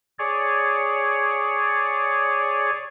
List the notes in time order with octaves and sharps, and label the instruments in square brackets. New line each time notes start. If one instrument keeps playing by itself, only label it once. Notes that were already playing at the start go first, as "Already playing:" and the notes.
[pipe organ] G#4 C#5 D5